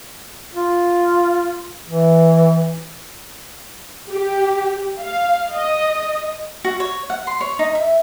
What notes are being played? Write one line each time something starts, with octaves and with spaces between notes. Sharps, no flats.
F4
E3
G4
F5
D#5
F#4
C#5
F#5
C6
C#5
D#4
E5